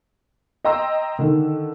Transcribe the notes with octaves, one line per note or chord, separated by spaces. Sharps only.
D#5 G5 A#5 C6 E6
D3 D#3